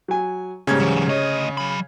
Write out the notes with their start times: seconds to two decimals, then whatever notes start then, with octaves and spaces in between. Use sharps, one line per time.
0.08 F#3 G#5
0.67 G#2 C#3 G3 C#4 G#6
0.80 E3 F#3
1.09 D2 C#5 D#5
1.57 F#3 B5